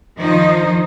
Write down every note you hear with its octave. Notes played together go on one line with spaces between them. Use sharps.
D#3 F3 D#4 C5